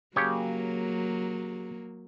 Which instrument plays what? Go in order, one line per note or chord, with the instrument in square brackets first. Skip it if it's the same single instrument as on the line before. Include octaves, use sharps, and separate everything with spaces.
[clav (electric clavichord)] C#3 G4 C#5 [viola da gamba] F#3 A#3